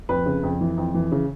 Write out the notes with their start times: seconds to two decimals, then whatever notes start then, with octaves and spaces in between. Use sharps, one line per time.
0.09 F2 B4
0.26 C#3
0.43 F2
0.61 E3
0.78 F2
0.95 E3
1.12 C#3